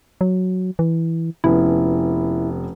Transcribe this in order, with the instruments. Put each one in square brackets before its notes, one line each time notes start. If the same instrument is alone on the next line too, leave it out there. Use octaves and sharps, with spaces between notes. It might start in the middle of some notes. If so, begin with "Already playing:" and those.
[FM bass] F#3
E3
[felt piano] F1 B3 C#4 [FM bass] E4